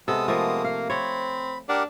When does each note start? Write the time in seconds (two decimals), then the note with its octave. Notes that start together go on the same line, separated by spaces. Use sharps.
0.08 C3 G#3 B3 A4 D#6
0.28 F3 A3 A#3
0.64 F5
0.90 C4 C#5 B5
1.69 D4 G4 A#4 F#5